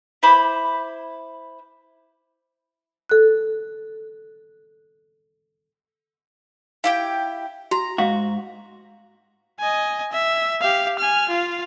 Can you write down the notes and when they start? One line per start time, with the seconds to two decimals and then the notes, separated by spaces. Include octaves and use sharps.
0.23 E4 C5 B5 D6
3.09 A4 F#6
6.84 E4 G4 F5 G5
7.71 F#4 A#5
7.98 G#2 F#4 F5
9.60 D#5 G#5
10.12 E5
10.61 G4 F5
10.99 G#5 F6
11.29 F4 F5